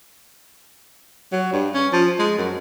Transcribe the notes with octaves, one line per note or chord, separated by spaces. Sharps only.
F#3
G2
C#4
F3
G#3
F#2